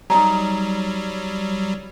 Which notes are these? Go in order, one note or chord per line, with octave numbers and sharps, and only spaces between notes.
F#3 G3 D#4 A#5